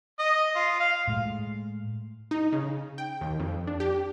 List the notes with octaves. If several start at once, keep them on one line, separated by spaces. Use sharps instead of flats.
D#5
F4
F5
A2 G#3
D#4
C#3
G5
D#2
F2
D4
G4